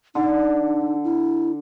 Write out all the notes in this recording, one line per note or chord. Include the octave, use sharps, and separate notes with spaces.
D3 D#4
E4